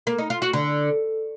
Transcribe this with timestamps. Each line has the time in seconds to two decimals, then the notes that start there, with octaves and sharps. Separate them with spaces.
0.07 A#3
0.18 D#4
0.30 F4
0.42 F#4
0.53 D3